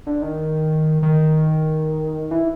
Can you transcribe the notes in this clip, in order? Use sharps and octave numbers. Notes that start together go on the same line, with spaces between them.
D3
D#3
D#3
E3